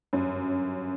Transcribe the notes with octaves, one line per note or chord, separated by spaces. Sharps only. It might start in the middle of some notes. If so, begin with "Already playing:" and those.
G1 F#2